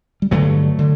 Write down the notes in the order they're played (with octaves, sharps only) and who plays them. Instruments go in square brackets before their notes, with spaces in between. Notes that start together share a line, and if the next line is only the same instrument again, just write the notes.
[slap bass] G3
G2 D3 F#3 A3
D3